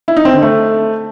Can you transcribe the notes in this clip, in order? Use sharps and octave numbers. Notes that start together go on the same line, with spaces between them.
E4
D#4
C4
D3
A3